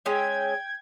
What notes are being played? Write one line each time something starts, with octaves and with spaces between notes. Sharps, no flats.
G#3 C#4 E5 G5 G#6